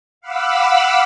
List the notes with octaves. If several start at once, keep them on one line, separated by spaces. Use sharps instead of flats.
F5 F#5 B5 D6 E6